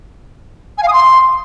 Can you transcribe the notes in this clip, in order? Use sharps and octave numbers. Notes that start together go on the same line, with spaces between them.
G#5
F5
D#6
C6